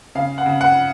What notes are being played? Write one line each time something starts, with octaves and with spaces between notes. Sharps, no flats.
C#3 F5
F#5
C#3
F#5